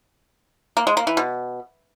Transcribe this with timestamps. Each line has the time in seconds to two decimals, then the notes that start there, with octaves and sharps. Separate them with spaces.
0.77 A#3
0.87 G#3
0.97 A#3
1.07 E3
1.17 B2